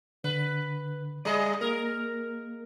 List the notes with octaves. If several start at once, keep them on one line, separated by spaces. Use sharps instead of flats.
D3 B4
G3 G#4 D5 D#5 B5
A#3 A#4